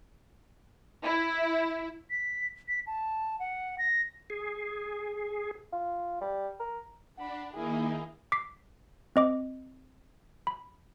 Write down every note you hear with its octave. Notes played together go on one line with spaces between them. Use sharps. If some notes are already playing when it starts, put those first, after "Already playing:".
E4
B6
B6
A5
F#5
A#6
G#4
F4
G3
A#4
D4 F#5 B5
D#3 A#3 D#4 E4 G#4
D6 B6 C7
C4 D#5 D6
B5